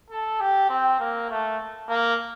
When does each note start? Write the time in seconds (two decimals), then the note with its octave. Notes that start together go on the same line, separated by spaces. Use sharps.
0.10 A4
0.40 G4
0.69 C4
1.00 A#3
1.30 A3
1.89 A#3